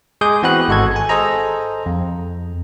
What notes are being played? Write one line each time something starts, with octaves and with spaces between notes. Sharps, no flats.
G#3 G#4 D6 D#6 G6
E3 B3 C4 F#4 B4 F#6
G#1 G#3 F#4 A4 G#6
G#5
G#4 A4 C5 D#5 A#5
F2